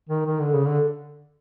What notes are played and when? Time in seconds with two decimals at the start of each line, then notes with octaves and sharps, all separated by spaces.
0.09 D#3
0.27 D#3
0.40 D3
0.54 C#3
0.67 D3